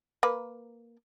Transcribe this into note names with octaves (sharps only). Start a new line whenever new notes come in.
A#3 B4